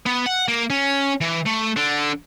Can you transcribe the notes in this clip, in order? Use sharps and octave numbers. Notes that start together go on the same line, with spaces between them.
B3
F#5
A#3
C#4
E3
A3
D3